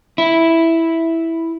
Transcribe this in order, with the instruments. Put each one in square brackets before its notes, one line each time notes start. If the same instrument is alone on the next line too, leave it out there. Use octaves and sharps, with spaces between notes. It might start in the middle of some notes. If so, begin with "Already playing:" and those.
[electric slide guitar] E4